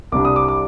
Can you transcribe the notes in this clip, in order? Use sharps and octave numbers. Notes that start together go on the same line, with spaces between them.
C2 C3 G3 D4 D6
D#6
D6
D6